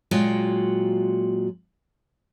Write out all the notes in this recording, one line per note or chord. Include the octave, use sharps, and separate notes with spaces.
A#2 F#3 G#3 F4 F#4 G5